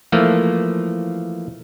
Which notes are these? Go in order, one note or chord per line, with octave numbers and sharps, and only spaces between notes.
E3 F3 A3 A#3